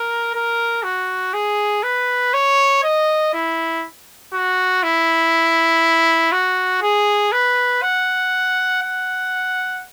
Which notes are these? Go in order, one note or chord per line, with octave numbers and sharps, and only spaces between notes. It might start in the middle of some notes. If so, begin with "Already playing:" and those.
Already playing: A#4
A#4
F#4
G#4
B4
C#5
D#5
E4
F#4
E4
F#4
G#4
B4
F#5
F#5